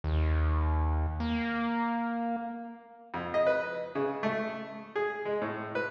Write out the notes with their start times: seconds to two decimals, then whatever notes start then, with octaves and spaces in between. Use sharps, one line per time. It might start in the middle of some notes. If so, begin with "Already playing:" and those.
0.04 D#2
1.20 A#3
3.14 F2
3.34 D#5
3.47 B4
3.95 C#3
4.23 A3
4.96 G#4
5.25 G#3
5.42 A2
5.75 B4